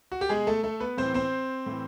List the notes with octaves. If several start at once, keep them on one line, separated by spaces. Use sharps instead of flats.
F#4
G4
B2 G#3 G#4
A3 A4
A3 A4
B3 B4
A2 E3 C4 C5
C4 C5
A2 E3